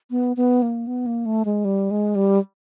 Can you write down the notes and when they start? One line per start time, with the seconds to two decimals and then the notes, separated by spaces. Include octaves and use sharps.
0.11 B3
0.37 B3
0.62 A#3
0.87 B3
1.06 A#3
1.26 A3
1.45 G#3
1.65 G3
1.91 G#3
2.15 G3